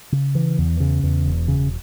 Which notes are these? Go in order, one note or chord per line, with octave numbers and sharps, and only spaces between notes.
C#3
E3
E2
C#3
E2
E1
C#3